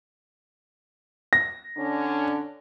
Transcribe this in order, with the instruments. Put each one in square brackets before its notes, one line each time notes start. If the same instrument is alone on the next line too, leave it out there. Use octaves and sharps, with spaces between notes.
[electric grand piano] A#6
[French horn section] D3 C#4 D4